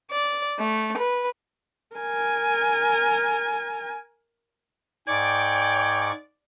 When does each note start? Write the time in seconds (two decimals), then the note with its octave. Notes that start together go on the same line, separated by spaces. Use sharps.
0.11 D5
0.57 A3
0.96 B4
1.96 A#4 G#5
5.08 G#2 D5 G5 G#5 C#6 D6